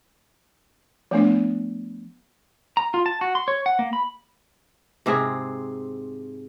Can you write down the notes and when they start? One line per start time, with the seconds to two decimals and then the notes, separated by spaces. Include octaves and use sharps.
1.11 F3 A3 B3 D4
2.77 A#5
2.94 F4
3.06 A5
3.21 F#4
3.35 C6
3.48 C#5
3.66 F#5
3.79 A#3
3.93 B5
5.06 G#2 C3 C4 G#4